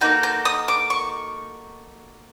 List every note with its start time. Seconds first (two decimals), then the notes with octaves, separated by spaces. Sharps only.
0.01 A#3 D#4 F#4 A4 G6
0.23 G6
0.45 D#6
0.68 D6
0.90 C#6